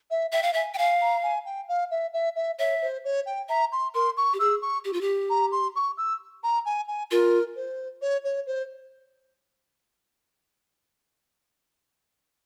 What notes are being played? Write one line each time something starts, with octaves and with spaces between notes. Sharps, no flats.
E5
E5 G5
F5
E5 G#5
G5
F5 G#5
A#5
G#5
G5
F5
E5
E5
E5
C#5 E5
C5
C#5
G5
E5 A#5
C6
A#4 C6
C#6
G4
G#4 E6
C#6
G4
F4
G4
A#5
C6
C#6
E6
A#5
G#5
G#5
F4 A#4
C5
C#5
C#5
C5